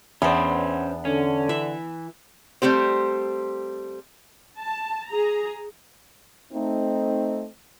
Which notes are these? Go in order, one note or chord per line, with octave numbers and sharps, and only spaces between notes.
E2 B3 C#4 D4 C5
D3 C#4
E3 E5
G3 A3 C4 G4 C5
A5
G#4 A#5
A3 C4 D#4